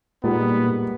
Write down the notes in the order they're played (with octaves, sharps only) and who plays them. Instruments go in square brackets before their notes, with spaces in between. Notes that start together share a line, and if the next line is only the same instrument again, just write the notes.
[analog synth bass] A#2 [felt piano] G3 G#3 D#4 [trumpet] B3